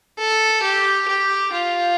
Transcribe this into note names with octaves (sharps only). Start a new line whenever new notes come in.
A4
G4
G4
F4